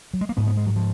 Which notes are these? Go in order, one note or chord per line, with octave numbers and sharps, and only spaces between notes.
F#3
G#3
A#3
G#2 B3
B3
G#3
F#3
F3